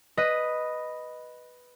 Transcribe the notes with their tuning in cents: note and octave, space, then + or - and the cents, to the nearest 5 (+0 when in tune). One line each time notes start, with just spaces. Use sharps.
B4 +0 D#5 +0